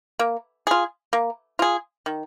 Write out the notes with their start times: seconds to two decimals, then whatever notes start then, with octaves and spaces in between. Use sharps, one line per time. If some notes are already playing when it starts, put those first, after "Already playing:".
0.19 A#3
0.67 F4 G#4
1.13 A#3
1.59 F4 G#4
2.06 D#3